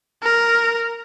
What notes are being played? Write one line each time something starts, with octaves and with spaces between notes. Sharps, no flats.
A#4